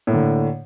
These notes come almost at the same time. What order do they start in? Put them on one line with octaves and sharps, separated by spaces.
A2 A#3 D3